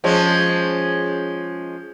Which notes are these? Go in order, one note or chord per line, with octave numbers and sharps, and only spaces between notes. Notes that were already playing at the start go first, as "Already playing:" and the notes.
F3 G#3 C#4